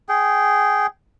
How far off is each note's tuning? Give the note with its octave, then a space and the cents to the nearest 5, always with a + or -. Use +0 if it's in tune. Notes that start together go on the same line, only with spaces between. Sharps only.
G#4 +0 G5 -20